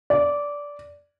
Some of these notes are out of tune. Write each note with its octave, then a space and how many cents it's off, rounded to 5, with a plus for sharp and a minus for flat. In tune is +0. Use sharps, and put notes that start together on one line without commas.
D5 -15